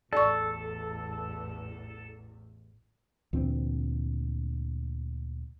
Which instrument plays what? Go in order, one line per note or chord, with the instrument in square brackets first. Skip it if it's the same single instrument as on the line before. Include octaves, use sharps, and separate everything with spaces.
[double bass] A1 E2 [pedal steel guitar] A4 [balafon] D5 C#6
[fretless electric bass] D2 A#2 E3 C4